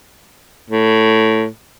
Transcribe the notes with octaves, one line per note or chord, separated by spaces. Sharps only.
A2